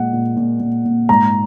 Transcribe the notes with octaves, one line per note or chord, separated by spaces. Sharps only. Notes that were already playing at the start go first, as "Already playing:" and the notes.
Already playing: A#2 G#3 F#5
A#2
A#2
A#2
A#2
G#2 A#5